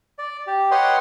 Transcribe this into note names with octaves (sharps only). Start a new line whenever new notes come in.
D5
G4
B4 C#5 D#5 F#5 G5 C6